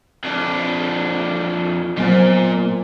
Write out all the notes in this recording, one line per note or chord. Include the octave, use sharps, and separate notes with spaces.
F2 D4
A#2 F#3 B3 C5